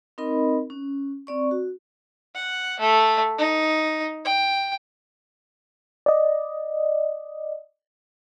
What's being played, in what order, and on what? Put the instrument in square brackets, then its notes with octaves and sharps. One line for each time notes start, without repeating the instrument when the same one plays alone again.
[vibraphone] C4 D#4 A#4 D#5 B5
C#4
C4 D5 C#6
F#4
[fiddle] F#5
A3
D#4
G5
[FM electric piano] D5 D#5